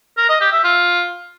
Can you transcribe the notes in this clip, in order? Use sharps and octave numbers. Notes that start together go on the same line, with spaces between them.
A#4
D#5
G4
E5
F4